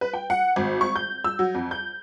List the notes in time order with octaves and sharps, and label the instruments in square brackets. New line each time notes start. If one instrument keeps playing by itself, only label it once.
[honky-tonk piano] B4
G5
F#5
G#1
C#6
G6
E6
F#3
F2
G6